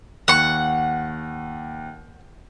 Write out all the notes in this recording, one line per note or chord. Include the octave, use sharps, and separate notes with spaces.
D#2 F#5 C#6